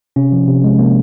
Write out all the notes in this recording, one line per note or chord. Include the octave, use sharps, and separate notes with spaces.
C3 C#4
F3
C3
G#3
C3 A#3